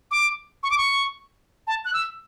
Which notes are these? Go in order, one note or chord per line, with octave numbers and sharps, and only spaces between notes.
D6
C#6
D6
C#6
A5
F#6
E6